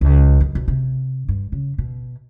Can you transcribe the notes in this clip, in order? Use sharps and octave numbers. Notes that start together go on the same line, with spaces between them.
C#2
F#2
B1
C3
G2
C#3
B2